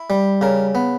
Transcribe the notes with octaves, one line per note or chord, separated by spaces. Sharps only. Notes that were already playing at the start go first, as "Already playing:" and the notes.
Already playing: E4
G3
C#3 A#4
B3